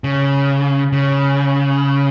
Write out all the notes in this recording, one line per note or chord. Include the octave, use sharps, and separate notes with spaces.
C#3
C#3